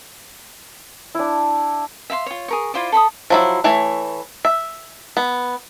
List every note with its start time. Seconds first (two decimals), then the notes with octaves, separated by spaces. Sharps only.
1.15 D4 E4
2.10 E5 F5 B5 C6
2.26 F4 C#5
2.48 G#4 A#4 C#6
2.74 E4 F4 C5 D5
2.92 A4 B5 C6 D#6
3.30 F3 F#3 E4
3.64 E3 A3 C#5
4.45 E5
5.17 B3